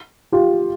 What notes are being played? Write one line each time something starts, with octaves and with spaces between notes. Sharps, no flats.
F4 G4